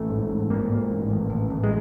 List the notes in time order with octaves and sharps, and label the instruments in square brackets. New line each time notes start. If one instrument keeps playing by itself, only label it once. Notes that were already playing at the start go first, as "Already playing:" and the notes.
Already playing: [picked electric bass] A1 A3
G#2
A1
G#2 A#3
G#2
A1
A1
A1
A1
G#3